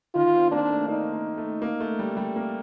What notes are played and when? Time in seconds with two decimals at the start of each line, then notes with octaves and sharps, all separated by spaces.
0.15 D#3 F4
0.33 C4
0.52 A#3 D4
0.70 A3
0.88 A#3 D#4
1.13 A#3
1.37 A3
1.62 A#3
1.80 A3
1.99 G3
2.17 G3
2.36 A#3